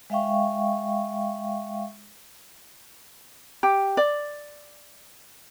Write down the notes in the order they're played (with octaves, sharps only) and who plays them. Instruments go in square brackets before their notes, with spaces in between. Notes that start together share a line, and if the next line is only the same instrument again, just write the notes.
[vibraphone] G#3 E5 F5 G5 C#6
[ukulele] G4
D5